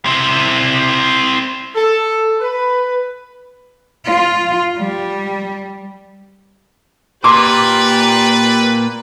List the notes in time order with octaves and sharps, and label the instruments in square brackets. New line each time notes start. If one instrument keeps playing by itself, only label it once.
[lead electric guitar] C4 E4
[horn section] A4
B4
[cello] F4
G3
[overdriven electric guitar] A#2 [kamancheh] G4 D5 [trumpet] B4 [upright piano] C6 D6